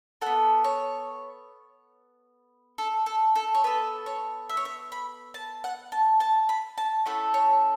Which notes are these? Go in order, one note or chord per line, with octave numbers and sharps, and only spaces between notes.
B3 A4 F#5
C#5
A4
A4
A4
C#5
B3 A4 B4
C#5
E5
C#5
E5
B5
A5
F#5
A5
A5
B5
A5
A3 C#4 E4 A4 F#5
C#5